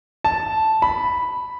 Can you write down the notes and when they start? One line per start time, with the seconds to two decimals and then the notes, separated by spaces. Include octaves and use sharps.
0.24 A5
0.82 B5